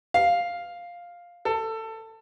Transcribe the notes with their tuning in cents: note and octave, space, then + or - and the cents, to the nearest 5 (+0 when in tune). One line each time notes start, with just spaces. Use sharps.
F5 +5
A4 +20